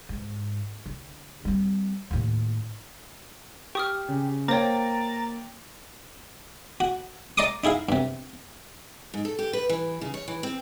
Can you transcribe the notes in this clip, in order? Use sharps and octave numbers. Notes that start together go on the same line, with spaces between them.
G#2
D3
G3 C4
D#2 A2
G4 C#6 D#6 F6
C#3
A#3 C5 C#5 G5 A#5 A6
F#4
D5 D#5 A#5 C6 D6 D#6
D#4 E4 G#4 F5
G2 C3
G#2
A4
G4
B4
E3
C#3
C#5
E3
C4